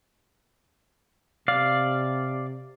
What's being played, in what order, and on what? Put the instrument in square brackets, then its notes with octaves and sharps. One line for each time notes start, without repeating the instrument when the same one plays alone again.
[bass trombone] C3 [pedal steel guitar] D5 F5